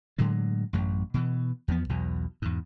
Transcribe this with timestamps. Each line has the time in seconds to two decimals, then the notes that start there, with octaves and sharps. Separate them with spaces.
0.18 A2 D3 F#3 G#3
0.73 A1 F#2
1.14 B2 E3
1.68 E2 F3 B3
1.89 B1 E2 B2
2.42 E2 G#2